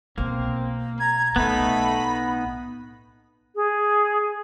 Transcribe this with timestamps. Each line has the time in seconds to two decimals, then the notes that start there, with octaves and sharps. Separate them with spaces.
0.18 B1 A#3 C4
1.00 A#5 G#6
1.36 B1 A2 A3 B3 D#4 B5
3.55 G#4